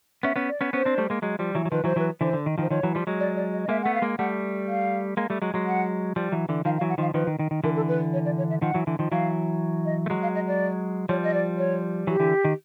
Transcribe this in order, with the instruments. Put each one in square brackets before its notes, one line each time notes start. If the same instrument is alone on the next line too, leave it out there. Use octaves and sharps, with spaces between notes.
[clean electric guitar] B3 C#4 [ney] E5
[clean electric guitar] B3 C#4
[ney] D5
[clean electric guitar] B3 C#4
[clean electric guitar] B3 C#4 [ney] C5
[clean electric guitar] C4 D4
G3 A3
G#3 A#3
F#3 G#3
F3 G3
E3 F#3
F#3
[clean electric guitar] D#3 F3 [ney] B4
[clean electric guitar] E3 F#3 [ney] C5
[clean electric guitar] E3 F#3 [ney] B4
[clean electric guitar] D3 E3 [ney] C5
[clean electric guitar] D3
D#3
D#3 F3
[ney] C5
[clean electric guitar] D#3 F3 [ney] C#5
[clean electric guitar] E3 F#3
F3 G3
F#3 G#3
[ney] D5
D5
D#5
D#5
[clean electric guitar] G#3 A#3 [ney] E5
[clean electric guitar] A3 B3 [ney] F#5
[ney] F5
[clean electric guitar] G#3 A#3
[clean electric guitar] G3 A3 [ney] F#5
[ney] F5
[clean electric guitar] G#3 A#3
G3 A3
F#3 G#3
F#3 G#3
[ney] F#5
[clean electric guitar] F3 G3
E3 F#3
D3 E3
[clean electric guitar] D#3 F3 [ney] F5
[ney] F5
[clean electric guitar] E3 F#3
[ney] F#5
[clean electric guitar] D#3 F3 [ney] F5
[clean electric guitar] D#3 F3 [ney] B4
[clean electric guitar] D#3
D#3
D#3
[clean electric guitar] D3 E3 [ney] A#4
[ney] A4
B4
C#5
D5
C#5
E5
[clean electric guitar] D#3 F3 [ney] F#5
[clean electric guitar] E3 F#3
D3 E3
D#3 F3
[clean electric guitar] E3 F#3 [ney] F5
[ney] D#5
[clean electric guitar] A3
F#3 G#3
[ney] F5
D#5
D5
[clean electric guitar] F3 G3 [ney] C#5
[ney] D#5
D5
C#5
[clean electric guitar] E3 F#3 [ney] G4
[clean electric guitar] D3 E3
D#3